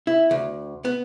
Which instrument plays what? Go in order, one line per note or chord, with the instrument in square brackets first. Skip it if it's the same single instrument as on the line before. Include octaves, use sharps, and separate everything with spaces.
[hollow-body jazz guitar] E4
D2
B3